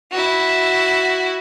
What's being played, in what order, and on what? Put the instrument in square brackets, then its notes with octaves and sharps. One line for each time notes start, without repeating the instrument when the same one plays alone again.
[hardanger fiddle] E4 F#4